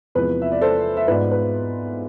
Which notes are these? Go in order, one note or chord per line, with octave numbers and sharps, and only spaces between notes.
E2 C3 F3 G#3 B4
E5
D5
A4 C5
E5
G#2 G#3 B3 F4 B4 D5
B4